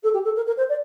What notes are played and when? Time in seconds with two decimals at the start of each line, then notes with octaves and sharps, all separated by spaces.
0.03 A4
0.13 G4
0.24 A4
0.35 A#4
0.46 A#4
0.57 C5
0.69 D5